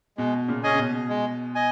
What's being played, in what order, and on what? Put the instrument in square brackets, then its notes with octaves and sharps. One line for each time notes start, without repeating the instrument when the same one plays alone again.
[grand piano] B2 [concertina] G#3
[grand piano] A#2 C#3
[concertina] C#4 G#4 D#5 G#5
[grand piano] C#3
B2
[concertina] G#3
D#5 G#5